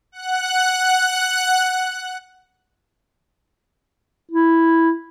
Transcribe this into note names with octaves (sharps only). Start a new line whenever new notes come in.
F#5 F#6
E4